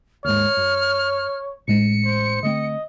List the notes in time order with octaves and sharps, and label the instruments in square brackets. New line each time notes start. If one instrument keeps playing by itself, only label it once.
[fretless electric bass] D#2 G#2 [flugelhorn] C#5 [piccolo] F6
[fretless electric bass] F#2
[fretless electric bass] A1 A2 G#3 [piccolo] C#7
[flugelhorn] C5
[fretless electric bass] D3 A3 C4 [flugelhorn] D#5